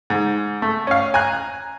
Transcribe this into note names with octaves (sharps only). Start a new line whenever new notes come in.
G#2
A3
C#4 F5
G#5 A#5 F#6